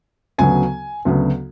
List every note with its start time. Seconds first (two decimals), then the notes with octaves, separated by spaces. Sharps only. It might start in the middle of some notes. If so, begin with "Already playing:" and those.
0.38 D2 C#3 F#3 B3 G#5
1.05 D2 C#3 F#3 B3